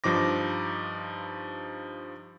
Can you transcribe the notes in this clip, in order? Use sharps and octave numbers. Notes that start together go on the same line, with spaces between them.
G2 F3 D#4 D6 A#6